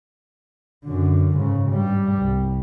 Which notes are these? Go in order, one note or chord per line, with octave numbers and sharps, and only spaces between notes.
F#2 D3
G#2 C#3
G2 G3
C2